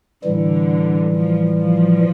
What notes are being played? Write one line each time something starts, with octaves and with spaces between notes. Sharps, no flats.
A2 D3 E3 G3
F3
F3